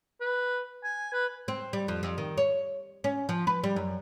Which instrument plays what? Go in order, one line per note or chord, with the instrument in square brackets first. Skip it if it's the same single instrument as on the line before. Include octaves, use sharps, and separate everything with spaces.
[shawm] B4
G#5
B4
[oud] C4
G3
F2
F2
D#3
C#5
C#4
F3
B4
G3
F#2